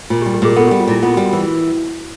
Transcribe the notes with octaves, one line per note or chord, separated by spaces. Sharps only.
A#2 F4
G4
G3
G4
A#2 G#4
B3 A4
G4
G3
F4
A#2 E4
B3 F4
F#4
G3
F#4
E3